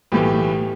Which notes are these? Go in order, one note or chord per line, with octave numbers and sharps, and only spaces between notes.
B1 A2 E3 G4